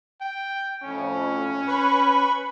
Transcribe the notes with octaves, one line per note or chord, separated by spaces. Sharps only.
G5
F2 A2 C#4
B4 B5 C#6